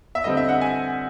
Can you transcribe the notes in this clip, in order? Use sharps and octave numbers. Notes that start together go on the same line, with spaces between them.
E5
D3 G3 C4 D#5
E5
F#5
G#5